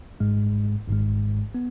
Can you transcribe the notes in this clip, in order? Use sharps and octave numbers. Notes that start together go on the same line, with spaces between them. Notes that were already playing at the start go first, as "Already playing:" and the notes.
G#1 G#2 G#3
G#1 G#2 G#3
B3